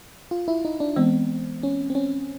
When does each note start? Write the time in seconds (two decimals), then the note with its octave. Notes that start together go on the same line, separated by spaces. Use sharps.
0.31 F4
0.48 E4
0.65 D#4
0.80 D4
0.96 E3 G#3 B3 C4
1.63 C#4
1.90 C4
1.95 C#4